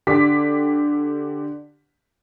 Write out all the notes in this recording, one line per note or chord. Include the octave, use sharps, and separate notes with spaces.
D3 G4 C6 D6 B6